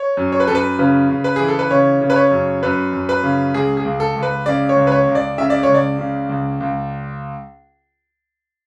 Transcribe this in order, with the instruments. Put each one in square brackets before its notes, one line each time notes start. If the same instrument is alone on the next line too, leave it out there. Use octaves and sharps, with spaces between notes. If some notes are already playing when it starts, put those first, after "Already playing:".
Already playing: [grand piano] C#5
F#2
C#5
B4
F#2 A4
B4
C#3 B4
C#3
B4
E3 G#4
A4
B4
C#3 C#5
C#3
B4
C#5
F#2
F#2 B4
F#2
B4
C#3
C#2 G#4
G#4
C#2
A4
C#2
B4
C#3 D5
C#5
C#2
B4
C#5
C#2
D5
C#3 E5
D5
C#5
C#2
D5
C#3
C#2
C#2